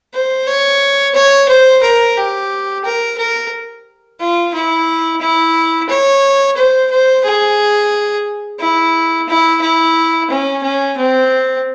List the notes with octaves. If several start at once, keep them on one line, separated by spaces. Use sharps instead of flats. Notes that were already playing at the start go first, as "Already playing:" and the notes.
C5
C#5
C#5
C5
A#4
G4
A#4
A#4
F4
E4
E4
C#5
C5
C5
G#4
E4
E4
E4
C#4
C#4
C4